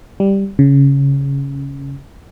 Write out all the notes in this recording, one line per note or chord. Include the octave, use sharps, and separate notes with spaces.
G3
C#3